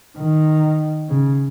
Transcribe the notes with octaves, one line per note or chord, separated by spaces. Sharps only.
D#3
C#3